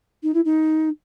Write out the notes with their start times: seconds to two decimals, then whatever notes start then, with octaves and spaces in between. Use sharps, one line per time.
0.23 D#4
0.34 E4
0.44 D#4